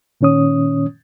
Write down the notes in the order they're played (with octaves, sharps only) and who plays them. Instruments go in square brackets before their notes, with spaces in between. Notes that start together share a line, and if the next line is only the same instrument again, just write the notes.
[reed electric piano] A#2 D#3 C#4 C#5 D#6